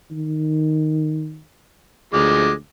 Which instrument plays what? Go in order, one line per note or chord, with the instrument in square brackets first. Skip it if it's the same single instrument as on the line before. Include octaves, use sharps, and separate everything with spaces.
[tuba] D#3
[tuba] D2 [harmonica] F3 G#3 D6